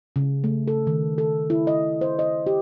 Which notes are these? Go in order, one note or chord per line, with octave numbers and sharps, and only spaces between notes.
C#3
A3
A4
D#3
A4
E4
D#5
C5
D#5
G4